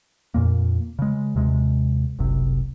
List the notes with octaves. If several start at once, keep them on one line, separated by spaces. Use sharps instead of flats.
F2 A#2 A#3
C#3 G#3
D#2 C3 G#3
F#1 C2 C3